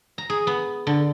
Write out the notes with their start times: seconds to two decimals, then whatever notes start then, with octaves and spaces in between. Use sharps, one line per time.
0.18 A#5
0.30 G#4
0.47 B3
0.87 D3